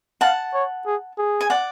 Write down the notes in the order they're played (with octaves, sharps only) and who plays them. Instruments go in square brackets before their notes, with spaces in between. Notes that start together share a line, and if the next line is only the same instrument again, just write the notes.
[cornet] F5 [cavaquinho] F#5 A5
[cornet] C#5
G#4
G#4
[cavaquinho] G#5
D5 F#5